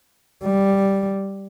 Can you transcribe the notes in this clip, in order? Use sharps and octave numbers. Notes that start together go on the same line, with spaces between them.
G3